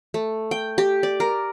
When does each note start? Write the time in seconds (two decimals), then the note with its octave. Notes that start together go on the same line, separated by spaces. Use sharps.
0.14 A3
0.51 G5
0.78 G4
1.03 D5
1.20 A#4